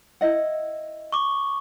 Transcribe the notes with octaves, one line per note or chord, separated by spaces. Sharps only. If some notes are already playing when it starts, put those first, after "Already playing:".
E4 D#5 F#5
C#6 D6